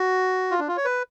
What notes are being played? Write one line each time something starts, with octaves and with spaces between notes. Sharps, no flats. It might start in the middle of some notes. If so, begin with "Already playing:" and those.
Already playing: F#4
F4
D4
F4
C#5
B4